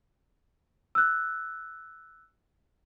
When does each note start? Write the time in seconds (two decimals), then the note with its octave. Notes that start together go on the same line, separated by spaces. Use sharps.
0.95 E6 F#6